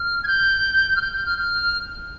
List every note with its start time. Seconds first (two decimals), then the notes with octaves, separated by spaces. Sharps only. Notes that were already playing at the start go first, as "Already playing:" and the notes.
Already playing: F6
0.23 G#6
0.27 G6
0.96 F6
1.02 G6
1.13 G6
1.26 F6
1.38 F6